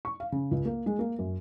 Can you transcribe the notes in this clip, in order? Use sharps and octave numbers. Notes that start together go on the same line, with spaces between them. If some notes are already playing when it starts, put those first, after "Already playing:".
C#6
F5
C#3
C#2
A#3
G#3
A#3
F#2